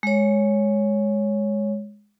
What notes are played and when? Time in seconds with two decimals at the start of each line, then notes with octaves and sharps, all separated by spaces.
0.03 G#3 C#5